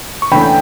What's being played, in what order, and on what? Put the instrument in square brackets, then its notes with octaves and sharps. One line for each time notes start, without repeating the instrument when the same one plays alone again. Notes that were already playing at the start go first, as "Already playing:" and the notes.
[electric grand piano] C#6
[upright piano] E2 D3 A3 C#4 [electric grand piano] G5 B5